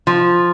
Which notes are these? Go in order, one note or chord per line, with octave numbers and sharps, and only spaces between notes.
F3